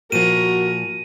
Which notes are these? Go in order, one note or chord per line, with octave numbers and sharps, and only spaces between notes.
A#2 F3 F#4 A#4 D#7